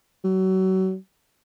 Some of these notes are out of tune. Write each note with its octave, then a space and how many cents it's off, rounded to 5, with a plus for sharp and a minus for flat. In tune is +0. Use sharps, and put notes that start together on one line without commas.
F#3 +30